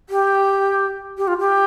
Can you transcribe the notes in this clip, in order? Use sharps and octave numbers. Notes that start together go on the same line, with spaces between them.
G4
G4
F4
G4